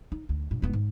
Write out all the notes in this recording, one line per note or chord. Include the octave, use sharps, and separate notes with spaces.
D#4
D2
G2 A#2
D#1 B3
G#2